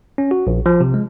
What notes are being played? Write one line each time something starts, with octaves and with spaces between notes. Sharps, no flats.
C#4
F#4
A#1
F3
C3
G#3